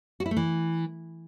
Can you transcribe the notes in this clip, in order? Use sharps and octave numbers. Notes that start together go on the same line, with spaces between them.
F#4
E4
A3
E3